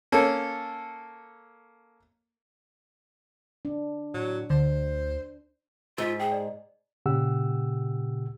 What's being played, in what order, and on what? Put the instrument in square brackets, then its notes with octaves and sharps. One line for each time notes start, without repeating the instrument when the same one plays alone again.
[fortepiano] A#3 C#4 A4
[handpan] D4
[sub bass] A2 [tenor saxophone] F#3
[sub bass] D2 [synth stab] D3 [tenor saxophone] C5
[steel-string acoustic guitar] G#2 [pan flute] F4 [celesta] E6 A6 B6
[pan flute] G#4 [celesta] G5
[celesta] D5 D#5
[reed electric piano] A#2 C#3 G4 F#5 E6